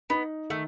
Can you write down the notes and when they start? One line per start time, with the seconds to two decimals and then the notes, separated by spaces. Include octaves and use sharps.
0.10 B3 D#4
0.50 D#3 A3